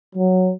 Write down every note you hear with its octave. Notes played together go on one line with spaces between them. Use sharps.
F#3